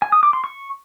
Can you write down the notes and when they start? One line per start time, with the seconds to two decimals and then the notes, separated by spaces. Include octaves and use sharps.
0.02 G#5
0.12 D#6
0.23 D6
0.33 C6
0.44 C#6